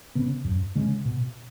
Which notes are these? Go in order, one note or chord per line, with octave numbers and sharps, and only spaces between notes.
C#3 B3
F#2
C#3 G#3 C#4
B2